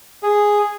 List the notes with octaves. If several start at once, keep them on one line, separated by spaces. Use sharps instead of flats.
G#4